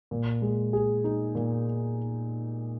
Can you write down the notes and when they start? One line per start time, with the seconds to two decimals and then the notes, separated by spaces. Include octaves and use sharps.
0.11 A#2
0.42 G#3
0.73 G#4
1.04 D#4
1.35 A#2